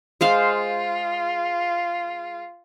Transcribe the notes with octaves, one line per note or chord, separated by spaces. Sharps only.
G#3 F4 C5 F5